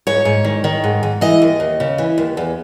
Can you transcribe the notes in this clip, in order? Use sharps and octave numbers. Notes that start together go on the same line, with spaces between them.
G#2 C#5
G#2
D#3
D#3
G#2
G#2
E3 D#5
D#2
D#2
C#3
E3
D#2
E2